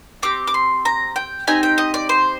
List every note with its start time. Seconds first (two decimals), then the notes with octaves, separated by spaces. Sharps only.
0.23 C4 G4 D6
0.47 D6
0.54 C6
0.85 A#5
1.16 G5
1.47 C4 D#4 G4 G#5
1.63 G5
1.78 D#5
1.94 D5
2.09 C5